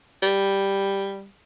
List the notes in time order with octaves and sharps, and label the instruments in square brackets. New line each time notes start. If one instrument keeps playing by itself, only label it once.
[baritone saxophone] G3